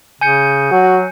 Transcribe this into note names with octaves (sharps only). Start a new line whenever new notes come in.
C#3 G#5 G6 C#7
F#3 F#4